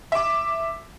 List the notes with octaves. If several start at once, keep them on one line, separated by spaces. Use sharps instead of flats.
E5 D6